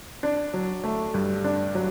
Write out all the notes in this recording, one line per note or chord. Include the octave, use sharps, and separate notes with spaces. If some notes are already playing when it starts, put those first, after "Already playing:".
D4
F#3
A3
G2
D4
F#3